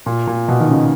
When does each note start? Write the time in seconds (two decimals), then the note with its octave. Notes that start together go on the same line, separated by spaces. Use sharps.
0.06 A#2
0.27 A#2
0.48 B2
0.60 D#3
0.70 C#3